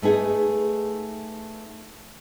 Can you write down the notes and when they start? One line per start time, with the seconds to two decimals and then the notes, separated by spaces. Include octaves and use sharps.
0.02 A3 B3 D#4 G#4